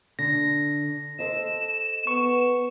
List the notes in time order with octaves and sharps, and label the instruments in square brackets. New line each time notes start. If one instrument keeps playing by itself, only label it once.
[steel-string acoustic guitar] D3 [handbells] A#6
[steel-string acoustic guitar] A4 C5 D#5 [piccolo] E7
[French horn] B3 [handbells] C#6